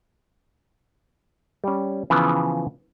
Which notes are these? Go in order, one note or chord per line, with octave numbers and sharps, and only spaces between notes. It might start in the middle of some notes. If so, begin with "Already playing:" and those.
G3 C#4
C#3 E3 F3 B3